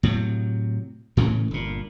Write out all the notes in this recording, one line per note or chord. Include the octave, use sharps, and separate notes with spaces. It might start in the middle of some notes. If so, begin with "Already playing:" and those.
A2 C3 F#3
A2 C#3 E3 A3
G1 A#2